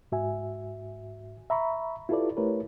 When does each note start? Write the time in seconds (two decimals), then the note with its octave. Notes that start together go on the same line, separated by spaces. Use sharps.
0.12 G#2 F#4 E5 G#5
1.50 E5 A#5 B5 C#6
2.09 E4 F4 G4 A4 B4 D5
2.37 A3 E4 G4 A#4 B4 C#5